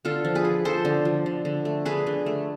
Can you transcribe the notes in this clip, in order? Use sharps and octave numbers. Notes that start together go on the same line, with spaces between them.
D3 F4 A4
F3
G#4 B4
F3
F3 A4 C5
D3
F3
D3
D3
A3
D3 G#4 B4
D3
A3